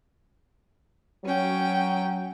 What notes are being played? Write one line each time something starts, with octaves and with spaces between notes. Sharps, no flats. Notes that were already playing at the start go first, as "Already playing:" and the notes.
F#3 C#4 G5